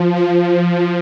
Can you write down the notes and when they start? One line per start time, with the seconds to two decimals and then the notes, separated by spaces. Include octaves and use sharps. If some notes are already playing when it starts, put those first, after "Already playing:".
Already playing: F3
0.16 F3